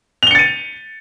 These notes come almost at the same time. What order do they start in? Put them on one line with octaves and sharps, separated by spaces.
F7 G7 C#7 A6 D#7